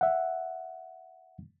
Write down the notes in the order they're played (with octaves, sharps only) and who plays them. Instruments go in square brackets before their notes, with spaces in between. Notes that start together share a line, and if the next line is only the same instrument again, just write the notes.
[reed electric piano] E5 F#5